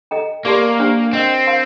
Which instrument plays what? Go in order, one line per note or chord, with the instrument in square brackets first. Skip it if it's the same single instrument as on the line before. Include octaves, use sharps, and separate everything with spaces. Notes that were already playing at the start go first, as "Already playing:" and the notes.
[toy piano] A4 D#5 G5 A#5
[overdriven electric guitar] A#3 [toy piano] G4 D5 A5 C6
[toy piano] D4 G4 C5 G5 A#5
[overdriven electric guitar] C4 [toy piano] A#4 D#5 G5
[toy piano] A#4 F5 A5 C6